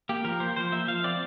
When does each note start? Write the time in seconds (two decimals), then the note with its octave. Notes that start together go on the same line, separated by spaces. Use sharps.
0.09 A#3 G4
0.25 F3 A#4
0.40 A#3 C5
0.56 F3 C5
0.72 A#3 E5
0.88 F3 F5
1.04 C4 D5